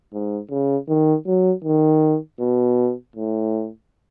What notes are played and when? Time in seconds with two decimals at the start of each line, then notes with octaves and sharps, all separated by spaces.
0.13 G#2
0.51 C#3
0.89 D#3
1.26 F#3
1.64 D#3
2.40 B2
3.16 A2